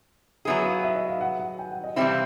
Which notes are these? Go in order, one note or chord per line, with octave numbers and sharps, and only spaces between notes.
F#3 B3 E4 G#4 E5
F5
E5
D#5
F5
F#5
F#5
G5
F#5
D#5
C3 E3 G3 C4 E4 E5
F5